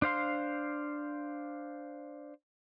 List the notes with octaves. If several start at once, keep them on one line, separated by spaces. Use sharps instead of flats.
D4 C5 F5 C6